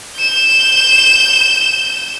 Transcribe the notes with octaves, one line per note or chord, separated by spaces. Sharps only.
G6 E7